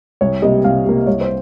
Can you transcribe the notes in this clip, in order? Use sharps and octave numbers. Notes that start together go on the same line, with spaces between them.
C2 C#5
C3 G3 A#3 D#5
C2 F5
C3 G3 A#3
C2 C#5
C5